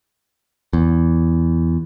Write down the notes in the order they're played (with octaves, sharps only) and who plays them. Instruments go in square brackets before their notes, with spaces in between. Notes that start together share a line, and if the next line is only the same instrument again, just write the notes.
[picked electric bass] E2